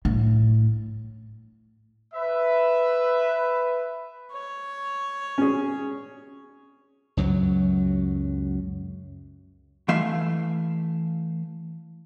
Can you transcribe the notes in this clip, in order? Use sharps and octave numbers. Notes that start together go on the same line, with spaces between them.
A2
B4 E5
C#5
C#4 G#4
C#2 F#2 F#3
E3 A3 E5 F5